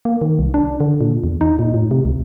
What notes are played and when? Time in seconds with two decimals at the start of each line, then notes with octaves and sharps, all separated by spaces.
0.05 A#3
0.21 D#3
0.39 C2
0.54 D4
0.80 D3
1.01 A#2
1.24 E2
1.41 D#4
1.59 A#2
1.74 A2
1.91 C3
2.05 C#2